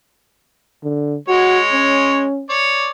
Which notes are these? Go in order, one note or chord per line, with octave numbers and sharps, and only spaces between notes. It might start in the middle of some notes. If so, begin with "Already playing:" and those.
D3
G#3 F#4 C#5
C#4
C#5 D5